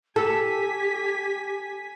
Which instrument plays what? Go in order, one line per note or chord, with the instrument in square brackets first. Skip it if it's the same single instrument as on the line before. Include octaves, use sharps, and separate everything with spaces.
[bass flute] G4 [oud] A4 [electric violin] G#5 B6